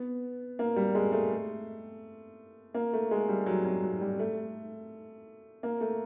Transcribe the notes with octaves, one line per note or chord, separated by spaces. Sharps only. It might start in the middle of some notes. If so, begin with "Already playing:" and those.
Already playing: B3
A#3
G3
G#3
A3
A#3
A3
G#3
G3
F#3
F#3
F#3
G3
A3
A#3
A3